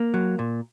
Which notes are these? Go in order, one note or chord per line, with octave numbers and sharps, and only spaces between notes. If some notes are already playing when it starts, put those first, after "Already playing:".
Already playing: A#3
F#3
A#2